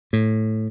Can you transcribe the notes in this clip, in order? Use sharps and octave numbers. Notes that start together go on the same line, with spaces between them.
A2